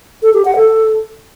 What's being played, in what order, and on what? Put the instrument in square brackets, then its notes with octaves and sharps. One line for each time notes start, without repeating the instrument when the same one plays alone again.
[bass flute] A4
G4
F#5
A4